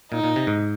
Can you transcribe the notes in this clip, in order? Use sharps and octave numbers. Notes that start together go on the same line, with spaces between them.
A#2 D#4
A#2
C3
G#2